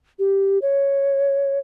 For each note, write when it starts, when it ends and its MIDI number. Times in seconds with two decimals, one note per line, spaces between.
0.19 0.59 67
0.62 1.59 73